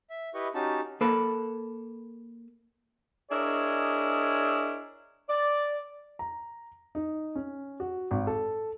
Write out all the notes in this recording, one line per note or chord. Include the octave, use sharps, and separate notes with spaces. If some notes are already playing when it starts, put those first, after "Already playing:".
E5
E4 G4 B4 D#5 C#6
C#4 D#4 F#4 G4 A5
A#3 A4 B4
D4 E4 G#4 A#4 C#5 D#5
D5
A#5
D#4
C#4
F#4
G#1
A4